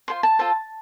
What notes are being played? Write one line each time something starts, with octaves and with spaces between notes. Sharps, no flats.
F4 A4 C5 C6
A5
F4 A4 C5